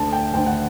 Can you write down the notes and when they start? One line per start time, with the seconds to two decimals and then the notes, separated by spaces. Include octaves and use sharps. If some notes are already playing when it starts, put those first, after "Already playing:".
Already playing: D2 D3 A5
0.12 G5
0.34 D2 D3 G5
0.47 F#5